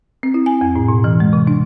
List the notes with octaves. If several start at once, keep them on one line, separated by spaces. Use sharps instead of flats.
C4
E4
G#5
F2
A2
B2
E3
G#3
C3
D4